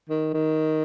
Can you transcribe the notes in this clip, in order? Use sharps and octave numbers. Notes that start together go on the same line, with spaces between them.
D#3
D#3